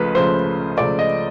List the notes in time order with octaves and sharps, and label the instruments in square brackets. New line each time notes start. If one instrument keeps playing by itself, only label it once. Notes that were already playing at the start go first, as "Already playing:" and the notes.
Already playing: [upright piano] C#2 C#3 F3 A3 B4
C#2 C#3 F3 A3 C5
C#2 C#3 F3 A3 D5
D#5